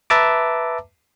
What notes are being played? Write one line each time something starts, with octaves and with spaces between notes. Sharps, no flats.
B4 E5 A5 A#5 D6